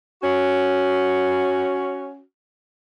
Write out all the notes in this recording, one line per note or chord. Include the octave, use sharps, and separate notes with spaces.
C#4 F#4